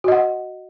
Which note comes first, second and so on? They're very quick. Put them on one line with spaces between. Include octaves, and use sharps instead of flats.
F#4 D#5 F#5